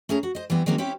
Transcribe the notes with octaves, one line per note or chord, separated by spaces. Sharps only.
A3 C#4 G#4 A#5
F#4
C5 D#5
E3 G3 B3 C4
D#3 F#3 G#3 A#3 C4 C#4
C4 C#4 E4 G4